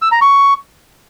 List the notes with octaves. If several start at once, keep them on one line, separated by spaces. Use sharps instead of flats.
E6
A#5
C#6